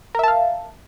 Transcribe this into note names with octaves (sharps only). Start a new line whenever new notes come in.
A#4 E5 F5 A5